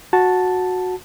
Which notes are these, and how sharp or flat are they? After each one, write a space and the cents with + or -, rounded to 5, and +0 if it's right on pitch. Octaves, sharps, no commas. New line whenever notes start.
F#4 -15 A5 +0